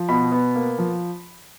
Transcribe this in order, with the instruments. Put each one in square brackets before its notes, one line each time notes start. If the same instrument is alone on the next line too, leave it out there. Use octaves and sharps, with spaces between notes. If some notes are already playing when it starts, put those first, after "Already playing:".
Already playing: [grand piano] F3
B2 B5
B3
A#3
F3